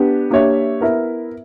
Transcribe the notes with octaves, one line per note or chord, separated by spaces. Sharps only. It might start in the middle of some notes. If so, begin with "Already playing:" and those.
Already playing: B3 D4 G4
A#3 D4 G4 C#5 E5
B3 E4 A#4 E5